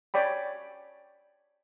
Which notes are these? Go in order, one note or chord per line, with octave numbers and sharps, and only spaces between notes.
C#5 D5 G5 B5